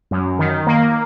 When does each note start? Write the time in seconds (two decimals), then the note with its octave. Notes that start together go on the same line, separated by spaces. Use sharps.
0.11 F#2
0.39 D#3
0.67 A#3